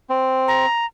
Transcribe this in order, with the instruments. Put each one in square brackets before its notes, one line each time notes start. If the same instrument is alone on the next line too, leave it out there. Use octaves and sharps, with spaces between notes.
[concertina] C4
[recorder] A#5